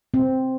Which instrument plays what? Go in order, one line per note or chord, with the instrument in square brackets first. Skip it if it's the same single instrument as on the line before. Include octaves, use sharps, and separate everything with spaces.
[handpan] C4